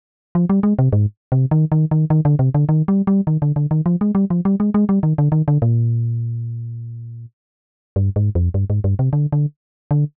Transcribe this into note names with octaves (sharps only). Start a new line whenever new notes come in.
F3
G3
G#3
C3
G#2
C3
D#3
D#3
D#3
D#3
D3
C3
D3
D#3
G3
G3
D#3
D3
D3
D#3
F3
G#3
G3
F3
G3
G#3
G#3
G3
D#3
D3
D#3
D3
A#2
G2
G#2
F2
G2
G#2
G2
C3
D3
D3
D3